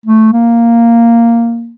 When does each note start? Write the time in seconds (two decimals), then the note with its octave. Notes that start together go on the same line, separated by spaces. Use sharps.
0.06 A3
0.33 A#3